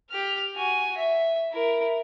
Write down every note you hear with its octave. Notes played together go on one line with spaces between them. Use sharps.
G4 F6
F#4 G#5
E5
E4 A#4